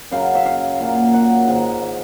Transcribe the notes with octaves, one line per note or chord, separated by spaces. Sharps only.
F#2 C#3 F#3 F5
E5
F5
A#2 F#3 A#3
F#5
G#2 D#3 G#3
E5